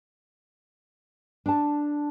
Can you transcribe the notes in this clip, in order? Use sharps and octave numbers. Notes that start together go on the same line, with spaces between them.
D4 A5